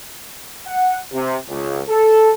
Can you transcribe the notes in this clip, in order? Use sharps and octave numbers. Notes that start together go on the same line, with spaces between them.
F#5
C3
C#2
A4